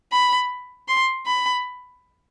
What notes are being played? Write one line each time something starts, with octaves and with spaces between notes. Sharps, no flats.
B5
C6
B5